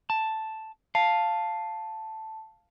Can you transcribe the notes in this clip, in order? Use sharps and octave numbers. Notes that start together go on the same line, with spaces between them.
A5
F5 A5